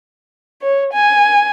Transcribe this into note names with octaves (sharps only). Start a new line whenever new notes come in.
C#5
G#5